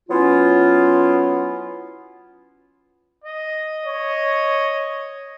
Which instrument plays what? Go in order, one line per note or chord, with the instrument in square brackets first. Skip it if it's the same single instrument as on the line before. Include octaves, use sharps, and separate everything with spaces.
[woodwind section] F#3 B3 C#4 E4 F4
[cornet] D#5
[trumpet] C#5